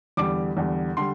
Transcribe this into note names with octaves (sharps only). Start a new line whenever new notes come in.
E2 D3 G3 D6
E2 D3 G3
D3 G3 C6